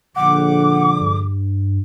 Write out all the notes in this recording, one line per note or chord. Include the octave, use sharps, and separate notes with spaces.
A#1 D3 F#5 D6
G2